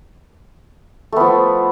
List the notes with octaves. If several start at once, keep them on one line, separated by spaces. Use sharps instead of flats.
F3 A3 B3